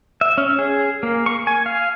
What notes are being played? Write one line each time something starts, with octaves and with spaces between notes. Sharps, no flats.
E5
C#4
G#4
A#3
C#6
G#5
F5